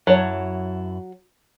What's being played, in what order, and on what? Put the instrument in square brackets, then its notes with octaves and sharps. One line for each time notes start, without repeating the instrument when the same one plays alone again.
[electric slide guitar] F#2 E4 A5 [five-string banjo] F#3 C#5